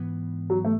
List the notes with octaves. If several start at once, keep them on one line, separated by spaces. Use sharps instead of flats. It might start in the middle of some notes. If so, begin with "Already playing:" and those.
Already playing: G#2 E3 B3
F#3
A3